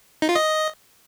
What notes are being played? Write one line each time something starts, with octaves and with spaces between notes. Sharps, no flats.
D#4
F4
D#5